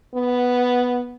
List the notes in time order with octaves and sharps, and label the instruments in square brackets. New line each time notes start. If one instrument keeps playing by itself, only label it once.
[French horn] B3